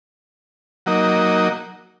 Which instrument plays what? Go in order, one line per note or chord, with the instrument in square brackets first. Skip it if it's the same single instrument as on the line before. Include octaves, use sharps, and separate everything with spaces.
[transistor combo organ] F#3 A#3 D#4